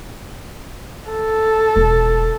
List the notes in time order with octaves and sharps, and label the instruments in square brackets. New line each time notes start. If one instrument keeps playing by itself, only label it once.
[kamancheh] A4
[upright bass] E1